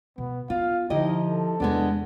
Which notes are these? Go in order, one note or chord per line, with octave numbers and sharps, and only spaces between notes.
B2 B3
B3 F4 F5
D3 F3 D#4 E4 G4 D#5
A4
E2 C3 G#3 B3 D4